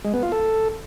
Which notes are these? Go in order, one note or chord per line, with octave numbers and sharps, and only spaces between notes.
G#3
B3
F4
A4